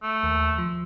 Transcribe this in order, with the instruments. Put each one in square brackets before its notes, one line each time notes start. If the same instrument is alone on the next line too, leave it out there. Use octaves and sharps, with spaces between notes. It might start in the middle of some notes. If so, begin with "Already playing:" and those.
[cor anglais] A3
[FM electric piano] D#2
F3